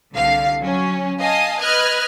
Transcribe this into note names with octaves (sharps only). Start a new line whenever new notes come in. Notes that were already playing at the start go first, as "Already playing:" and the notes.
C2 D3 F5
F#3 C#4
D#5 F5 G#5 A5 D#6
B4 D#5 F6 F#6 G#6